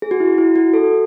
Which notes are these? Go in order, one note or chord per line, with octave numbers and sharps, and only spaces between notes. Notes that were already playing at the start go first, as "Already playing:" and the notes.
G#4
F#4
E4
E4
F#4
A4